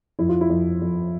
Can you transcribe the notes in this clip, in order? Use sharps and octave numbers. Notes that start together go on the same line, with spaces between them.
F2 E4
F4
E4
F2
F2